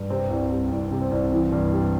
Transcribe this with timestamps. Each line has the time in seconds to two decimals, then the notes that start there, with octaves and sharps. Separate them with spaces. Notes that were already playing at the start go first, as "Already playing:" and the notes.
Already playing: G2
0.10 C3 C4
0.30 C2
0.51 G3
0.71 C2
0.91 C3
1.01 C4
1.11 C2
1.32 E3
1.52 G2
1.72 G3